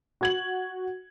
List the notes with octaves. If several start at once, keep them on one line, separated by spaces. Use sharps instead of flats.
F#4 G#6 F#7